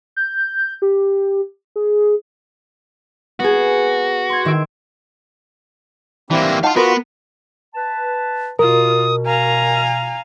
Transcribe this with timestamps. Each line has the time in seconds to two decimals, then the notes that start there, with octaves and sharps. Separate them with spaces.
0.16 G6
0.82 G4
1.76 G#4
3.40 B3 F#4 G#4
4.29 C6 G#6
4.45 D#3 E5 D7
6.30 E3 A#3 C4 D4 E4 G4
6.63 D#4 F5 F#5 A5 C6
6.76 B3 F4 F#4 A#4 B4
7.75 B4 A5
8.59 B2 F4 A#4 D#6
9.26 F5 G#5 A#5